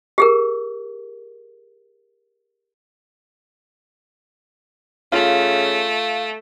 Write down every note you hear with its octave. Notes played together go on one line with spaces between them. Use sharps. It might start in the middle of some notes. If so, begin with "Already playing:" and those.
G4 G#4 A#4
C#3 A3 F4 F5